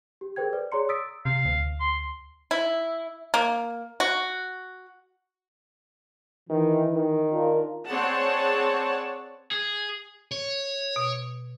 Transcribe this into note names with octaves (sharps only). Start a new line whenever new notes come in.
G4
G#4 A#4 C5 G5 G#6
A4 B4 D5
G#4 C#5 D5 A#5 C6 C#7
D#6 E6 A6 B6 D7
C3 F5
D2
C6
E4
A#3
F#4
D#3 E3
D#3
D4 F4 A#4
C4 G#4 C#5 D5 F#5 A5
G#4
C#5
B2